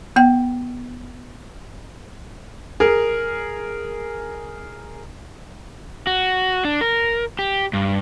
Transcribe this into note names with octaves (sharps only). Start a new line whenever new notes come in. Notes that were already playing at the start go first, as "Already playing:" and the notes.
B3 G5
G#4 A#4
F#4
D4
A#4
G4
G2